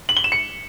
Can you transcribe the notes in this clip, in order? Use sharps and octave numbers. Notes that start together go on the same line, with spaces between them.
F#7
G7
E7
C#7